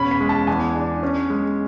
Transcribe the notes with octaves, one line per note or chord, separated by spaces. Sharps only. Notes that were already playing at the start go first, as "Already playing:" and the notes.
Already playing: E1 C#4 B5
B5
G#3
A5
E2 G#5
D4
C#4
G#3